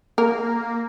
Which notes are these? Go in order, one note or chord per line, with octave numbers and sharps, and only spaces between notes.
A#3 A#4